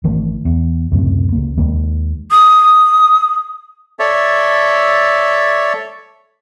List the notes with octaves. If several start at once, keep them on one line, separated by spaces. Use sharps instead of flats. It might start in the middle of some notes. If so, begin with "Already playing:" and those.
G#1 D#3 E3 A3
E2
C#2 F#2 A2 C3
C#2 A#3
D#2 D#3 G#3 A#3
D#6
A4 C#5 D5 E5